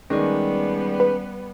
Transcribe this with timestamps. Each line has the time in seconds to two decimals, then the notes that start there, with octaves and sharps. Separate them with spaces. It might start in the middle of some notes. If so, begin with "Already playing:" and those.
0.10 D#3 G3 G#3 B3 C#4 D5
1.00 B4